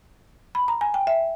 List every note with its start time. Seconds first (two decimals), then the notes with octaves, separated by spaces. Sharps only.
0.55 B5
0.68 A#5
0.81 G#5
0.94 G5
1.07 E5